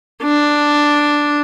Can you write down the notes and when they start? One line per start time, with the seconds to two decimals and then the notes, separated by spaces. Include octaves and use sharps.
0.23 D4